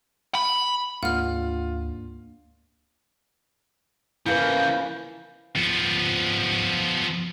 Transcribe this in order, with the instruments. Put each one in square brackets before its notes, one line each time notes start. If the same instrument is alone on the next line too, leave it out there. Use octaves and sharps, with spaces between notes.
[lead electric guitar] B5
[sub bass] D2 [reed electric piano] G#2 A#3 D4 [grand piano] F4 [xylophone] F#5 F6
[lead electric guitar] C#3 E3 [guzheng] F3 A#3 [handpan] E4 B4 [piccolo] G6
[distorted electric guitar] F3 B3